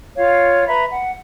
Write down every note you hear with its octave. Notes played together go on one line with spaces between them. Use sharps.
F4 C#5 F5
B4 E5 A#5 B5
F#5